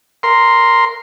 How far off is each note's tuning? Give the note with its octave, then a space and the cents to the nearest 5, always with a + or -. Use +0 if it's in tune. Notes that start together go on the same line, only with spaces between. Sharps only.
A#4 +0 C6 +0